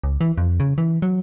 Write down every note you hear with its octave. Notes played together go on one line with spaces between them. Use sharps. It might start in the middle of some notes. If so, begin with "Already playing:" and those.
C#2
E3
F2
C#3
E3
F#3